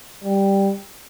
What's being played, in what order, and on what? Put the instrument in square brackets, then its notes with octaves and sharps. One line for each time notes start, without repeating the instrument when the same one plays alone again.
[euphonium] G3